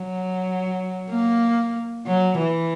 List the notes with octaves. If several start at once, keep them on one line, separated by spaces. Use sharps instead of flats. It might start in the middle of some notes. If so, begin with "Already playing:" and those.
Already playing: F#3
A#3
F#3
E3